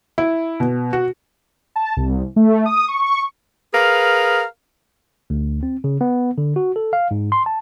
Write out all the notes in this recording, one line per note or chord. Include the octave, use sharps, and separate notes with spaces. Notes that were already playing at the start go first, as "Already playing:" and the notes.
E4
B2
F#4
A5
C2
A3
D#6
C#6
C#6
G#4 A#4 B4 F5
D2
C4
C#3
B3
D3
F#4
A4
F5
G#2
C6
A5